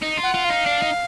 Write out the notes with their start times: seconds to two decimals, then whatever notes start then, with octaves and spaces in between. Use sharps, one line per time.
0.02 D#4
0.17 F4
0.23 F#5
0.34 F4
0.45 D#4 F5
0.66 D4
0.82 D#4